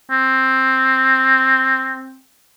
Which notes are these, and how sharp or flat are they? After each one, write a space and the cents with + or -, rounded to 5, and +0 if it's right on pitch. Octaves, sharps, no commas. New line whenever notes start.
C4 +10